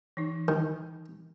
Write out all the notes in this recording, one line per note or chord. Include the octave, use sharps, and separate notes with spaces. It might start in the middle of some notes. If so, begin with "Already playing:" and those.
E3 D#4
D#3